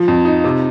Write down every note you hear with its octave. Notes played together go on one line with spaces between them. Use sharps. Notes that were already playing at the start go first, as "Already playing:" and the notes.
Already playing: F3 F4
F2
D#4
C3